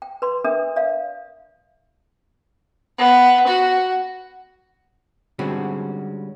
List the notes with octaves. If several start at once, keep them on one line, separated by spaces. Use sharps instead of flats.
G5
B4 C6
D4 A#4 E5 G5 D#6
D5 E5 F5
B3
F#4
D3 G3 G#3 C4 C#4 F#4